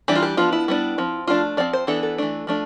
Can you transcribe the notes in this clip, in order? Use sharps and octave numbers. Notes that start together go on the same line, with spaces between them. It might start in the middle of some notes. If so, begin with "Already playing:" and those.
E3 G3 D4 G4
F4
G4
F3 B3 D4 F4
E4
G3 B3 D4
F3 C4
F3 A3 D4 F4
F3 C4 D5
C5
E3 B3 D4 A4
A4
E3 A3 D4
F3 A3 D4